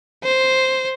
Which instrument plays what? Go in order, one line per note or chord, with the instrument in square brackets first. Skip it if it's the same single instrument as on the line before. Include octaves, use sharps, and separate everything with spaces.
[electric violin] C5